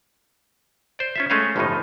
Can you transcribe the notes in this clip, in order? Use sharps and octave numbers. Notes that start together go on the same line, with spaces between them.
C5 D5
C#4 F4 E5
G#3 A3 C#4 D#5 F5
G1 A2 C#3 E3 F3 D#4